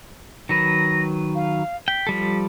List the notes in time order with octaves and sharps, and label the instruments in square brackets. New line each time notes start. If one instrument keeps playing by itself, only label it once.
[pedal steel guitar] D#3 F#3 B4 [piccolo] A#6
[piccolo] F5
[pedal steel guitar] G5 [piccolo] B6
[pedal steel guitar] F3 G3 A4